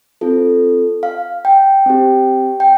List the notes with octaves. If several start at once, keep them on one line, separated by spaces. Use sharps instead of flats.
C4 F4 A4
F5
G5
C4 G4
G5